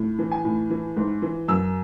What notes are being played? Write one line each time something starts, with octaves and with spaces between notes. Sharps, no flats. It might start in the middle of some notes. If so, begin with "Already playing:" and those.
Already playing: A2
E3
G#5
A2
E3
G#2
E3
F#2 E6